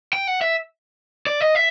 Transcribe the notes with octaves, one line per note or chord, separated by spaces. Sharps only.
G5
F#5
E5
D5
D#5
E5